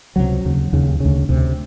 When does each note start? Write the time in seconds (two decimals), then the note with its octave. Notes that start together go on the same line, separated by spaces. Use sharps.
0.16 C#2 C3 F#3
0.45 D#2 C#3
0.73 D#2 C#3
1.00 D2 C#3
1.29 D2 C3